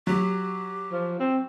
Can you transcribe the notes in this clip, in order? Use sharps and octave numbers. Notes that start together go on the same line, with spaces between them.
F#3 G4
F3
C4